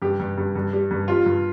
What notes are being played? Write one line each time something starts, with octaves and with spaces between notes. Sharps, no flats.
G2 G4
G2
G2
G2
G3
G2
G3 F4
G2